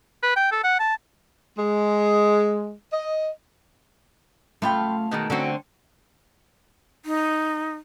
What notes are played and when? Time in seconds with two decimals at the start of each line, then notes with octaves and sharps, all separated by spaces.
0.23 B4
0.36 G5
0.51 A4
0.64 F#5
0.79 A5
1.58 G#3
2.92 D#5
4.62 F#2 C#3 A3 F4 G5 B5 C6
5.11 B2 D#3 G#3 D#4 A5
5.30 D3 C4 C#4 F#4
7.05 D#4